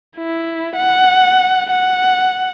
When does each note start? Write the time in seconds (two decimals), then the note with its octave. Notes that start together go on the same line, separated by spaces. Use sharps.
0.16 E4
0.76 F#5
1.71 F#5